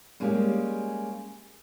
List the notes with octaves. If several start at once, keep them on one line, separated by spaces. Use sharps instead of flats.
G3 G#3 A#3 C#4 G4 G#4